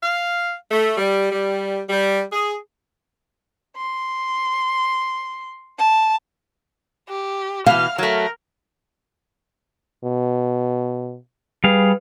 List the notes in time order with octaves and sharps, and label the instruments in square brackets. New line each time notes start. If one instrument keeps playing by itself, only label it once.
[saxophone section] F5
A3
G3
G3
G3
G#4
[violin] C6
A5
[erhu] G4
[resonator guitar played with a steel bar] B2 E3 [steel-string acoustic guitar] F5 [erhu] F6
[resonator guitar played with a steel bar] F#3 A3 [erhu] A#4
[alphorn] B2
[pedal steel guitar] G3 G#4 F5 [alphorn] B4